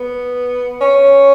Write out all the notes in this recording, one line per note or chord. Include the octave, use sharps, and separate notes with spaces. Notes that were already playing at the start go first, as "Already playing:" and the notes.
Already playing: B3
C#4